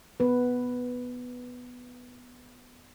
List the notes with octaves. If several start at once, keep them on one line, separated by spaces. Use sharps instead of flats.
B3 B4